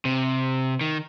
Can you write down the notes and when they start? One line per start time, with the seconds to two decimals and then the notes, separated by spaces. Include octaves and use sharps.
0.05 C3
0.81 D#3